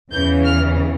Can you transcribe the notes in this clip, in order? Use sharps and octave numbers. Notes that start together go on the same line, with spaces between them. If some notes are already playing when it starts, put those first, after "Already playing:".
E2 C#3 E3 G6
F6